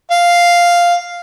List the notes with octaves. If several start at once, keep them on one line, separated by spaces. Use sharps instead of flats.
F5